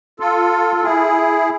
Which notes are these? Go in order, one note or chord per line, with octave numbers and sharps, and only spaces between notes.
F4 A4
A4
E4 G#4